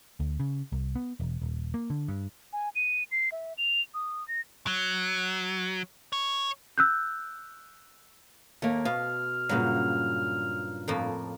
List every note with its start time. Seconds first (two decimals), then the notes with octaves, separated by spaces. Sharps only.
0.20 D2
0.40 C#3
0.72 C2
0.95 B3
1.20 E1
1.42 D#1
1.74 A#3
1.90 D3
2.08 G2
2.53 G#5
2.75 D#7
3.11 C7
3.32 E5
3.58 F7
3.94 D#6
4.28 A#6
4.67 F#3
6.13 C#5
6.78 E6 F#6 G6
8.62 D#2 A3 A#3
8.85 B2 F5 F6
9.49 G2 A#2 C#3 F#3
10.88 F2 A2 A#3